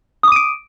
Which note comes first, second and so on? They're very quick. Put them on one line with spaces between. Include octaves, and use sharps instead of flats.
D#6 D6 D#7 D7